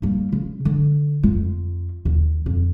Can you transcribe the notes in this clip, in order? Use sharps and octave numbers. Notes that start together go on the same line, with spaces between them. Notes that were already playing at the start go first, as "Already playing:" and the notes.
G3 A#3
C#3
D3
F2 F4
D#2
F2